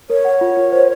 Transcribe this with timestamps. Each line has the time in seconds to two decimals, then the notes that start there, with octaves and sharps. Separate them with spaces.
0.10 A#4 C#5
0.25 F#5
0.41 F4
0.57 F4
0.72 C5